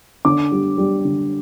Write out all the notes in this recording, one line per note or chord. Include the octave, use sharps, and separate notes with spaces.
D3 D6
G3
G3
D3